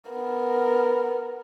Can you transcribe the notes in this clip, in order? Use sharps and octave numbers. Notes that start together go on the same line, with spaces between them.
B3 A#4